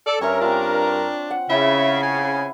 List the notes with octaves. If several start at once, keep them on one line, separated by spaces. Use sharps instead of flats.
A4 D5
G2 C#4 A#4 C#5 E5
C4 D4 F4
F#5
C#3 E4 E5
G#5